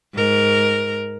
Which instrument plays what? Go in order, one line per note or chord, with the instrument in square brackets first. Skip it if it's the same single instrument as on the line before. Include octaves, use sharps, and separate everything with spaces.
[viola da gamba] G#2 A#4